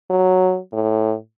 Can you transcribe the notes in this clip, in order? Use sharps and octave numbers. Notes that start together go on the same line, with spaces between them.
F#3
A2